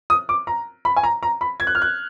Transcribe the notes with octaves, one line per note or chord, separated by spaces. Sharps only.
D#6
D6
A#5
B5
G#5
A#5
A#5
B5
G#6
F#6
F6
F#6